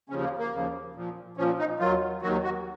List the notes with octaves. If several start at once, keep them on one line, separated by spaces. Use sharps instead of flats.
D#2 C#3 F3 C#4
A#3
A#3
D#2 C#3 F3
A#2 F3
A#2 F3 C#4
D#4
D#2 D#3 F#3 F4
D#2 D#3 F#3 F#4
F#4